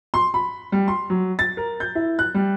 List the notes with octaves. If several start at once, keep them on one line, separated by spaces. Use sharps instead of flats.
C6
B5
G3
C6
F#3
A6
A#4
G6
E4
F#6
G3